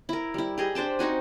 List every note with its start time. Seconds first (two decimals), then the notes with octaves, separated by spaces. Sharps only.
0.09 E4 A#4
0.34 G3 E4
0.58 G4 G#4 D#5
0.75 D4 C5 G5 A5
0.99 C4 D#4 F#4 G#5